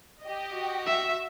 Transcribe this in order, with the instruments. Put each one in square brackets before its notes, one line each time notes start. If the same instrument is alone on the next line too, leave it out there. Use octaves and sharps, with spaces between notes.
[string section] G4 D#5
[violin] F#4
[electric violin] E5